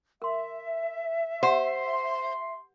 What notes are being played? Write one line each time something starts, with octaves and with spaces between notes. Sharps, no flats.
A#4 E5 C6
G4 C5 F#5 C6